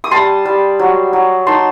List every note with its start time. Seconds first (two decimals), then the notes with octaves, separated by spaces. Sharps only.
0.04 D#6
0.11 G3 A5 C6
0.45 G3
0.79 F#3
1.13 F#3
1.47 D#4 A5 C6